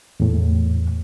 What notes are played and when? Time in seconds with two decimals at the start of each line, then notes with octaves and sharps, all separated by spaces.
0.20 E2 A2